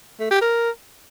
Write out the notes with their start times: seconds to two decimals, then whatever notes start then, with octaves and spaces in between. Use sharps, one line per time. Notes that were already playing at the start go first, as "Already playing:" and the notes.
0.20 A3
0.31 G4
0.41 A#4